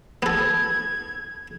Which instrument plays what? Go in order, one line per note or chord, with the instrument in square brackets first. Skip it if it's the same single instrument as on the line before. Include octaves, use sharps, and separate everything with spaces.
[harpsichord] B3 A4 [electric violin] G#6